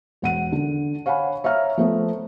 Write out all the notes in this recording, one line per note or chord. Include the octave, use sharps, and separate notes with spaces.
E1 F#5 D#7
D3
C#5 F5 F#5 G#5 B5
C#5 E5 F5 A#5 F6
F3 A3 B3